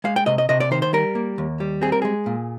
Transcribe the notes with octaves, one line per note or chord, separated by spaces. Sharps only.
G#3 F5
G5
C3 D#5
D#5
C3 D#5
D5
D#3 C5
C5
G3 A#4
A#3
D#2
G3
C4 G#4
A#4
G#3 G#4
A#2